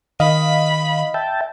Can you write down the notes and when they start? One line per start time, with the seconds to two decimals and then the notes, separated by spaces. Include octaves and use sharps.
0.20 D#3 D#5 F5 B5
1.14 E5 G5 A5